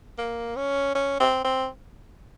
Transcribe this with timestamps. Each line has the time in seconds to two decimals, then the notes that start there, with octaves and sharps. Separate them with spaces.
0.18 A#3
0.56 C#4
0.95 C#4
1.20 C4
1.44 C4